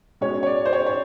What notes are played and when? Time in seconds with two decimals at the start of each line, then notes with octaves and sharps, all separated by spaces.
0.21 B2 G#3 C#4 C#5
0.43 C#5
0.46 D5
0.65 C5
0.73 C#5
0.86 C#5